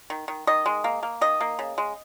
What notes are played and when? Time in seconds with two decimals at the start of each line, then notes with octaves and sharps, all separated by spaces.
0.10 D#3
0.28 D#3
0.47 D#3 D#5
0.66 G#3
0.84 A#3
1.03 A#3
1.21 D#3 D#5
1.41 A#3
1.59 C#3
1.78 G#3